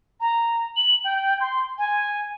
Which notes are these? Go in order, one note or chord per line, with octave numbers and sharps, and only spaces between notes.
A#5
F#7
G5
C6
G#5